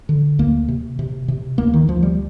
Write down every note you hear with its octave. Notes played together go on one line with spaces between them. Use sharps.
D3
D2 A#3
C3
C3
C3
D2 A#3
D#3
D2 F3
G3